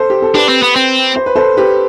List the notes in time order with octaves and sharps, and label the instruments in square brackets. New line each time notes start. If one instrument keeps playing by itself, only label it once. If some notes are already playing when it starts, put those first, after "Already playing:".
Already playing: [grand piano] A4 C5
G4
A4
[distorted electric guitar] D4 [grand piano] G4 B4
[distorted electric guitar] C4
B3
C4
[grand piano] C5
B4
A4 C5
G4 B4